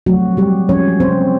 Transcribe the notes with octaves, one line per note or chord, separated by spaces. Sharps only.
F3 F#3 A3 C4 F#4
G3 G4
F3 G#3 C4 C#4 C#5
C4 C5